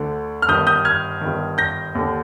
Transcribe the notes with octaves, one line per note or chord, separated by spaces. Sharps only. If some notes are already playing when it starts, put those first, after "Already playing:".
Already playing: D2 D3
F6
G1 G2 D#3 D#6 G6
D#6 G6
F6 G#6
G1 G2 D#3
G6 A#6
D#2 D3